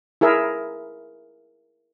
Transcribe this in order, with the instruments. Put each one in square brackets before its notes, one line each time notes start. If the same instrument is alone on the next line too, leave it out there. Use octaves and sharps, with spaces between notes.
[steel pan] E4 G#4 A#4 E5